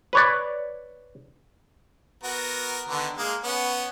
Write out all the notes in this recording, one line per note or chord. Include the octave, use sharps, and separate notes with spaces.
B4 C#5 D5
B3 F#4 A#4
D3 D#3 B3
G#3 A#3 D#6
B3 C#4